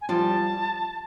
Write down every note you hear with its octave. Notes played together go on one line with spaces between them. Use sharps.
G#5
F3 G3 A5